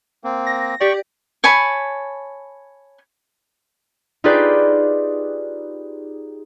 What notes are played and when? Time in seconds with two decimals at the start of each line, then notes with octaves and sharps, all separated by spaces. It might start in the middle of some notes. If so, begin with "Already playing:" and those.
0.24 A#3 C4
0.47 A#6
0.81 G4 D5 G5 C#6
1.44 C#5 G#5 A5 B5
4.24 D#4 F4 G4 G#4 B4 D5